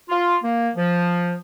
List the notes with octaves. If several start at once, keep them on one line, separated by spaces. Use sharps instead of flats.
F4
A#3
F3